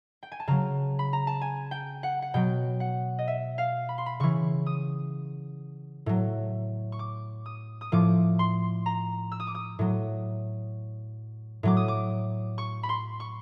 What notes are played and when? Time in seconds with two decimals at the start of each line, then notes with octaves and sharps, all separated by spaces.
0.23 G5
0.32 G#5
0.40 A5
0.48 C#3 F#3 A#5
0.99 B5
1.13 A#5
1.27 A5
1.41 G#5
1.71 G5
2.03 F#5
2.22 F#5
2.34 B2 F#3 G5
2.80 F#5
3.19 D#5
3.28 E5
3.58 F5
3.89 B5
3.98 C6
4.06 B5
4.20 C#3 E3 C#6
4.66 D#6
6.06 A2 F#3
6.92 C#6
6.99 D6
7.46 D#6
7.81 D#6
7.92 A2 F3 D6
8.39 C6
8.86 A#5
9.32 E6
9.40 D#6
9.47 D6
9.55 D#6
9.79 A2 F#3
11.63 A2 F#3 D6
11.77 D#6
11.88 D6
12.58 C#6
12.83 B5
12.89 C6
13.20 C#6